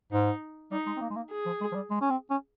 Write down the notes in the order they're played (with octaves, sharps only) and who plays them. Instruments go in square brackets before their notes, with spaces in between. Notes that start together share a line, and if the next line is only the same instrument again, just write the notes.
[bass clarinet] G#2 [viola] D#4
[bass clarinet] G3 [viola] D#4
[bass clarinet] G#3
C4
A#3
G#3
A#3
[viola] G#4
[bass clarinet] F3
G#3
F3
G3
G#3
C#4
C4
C#4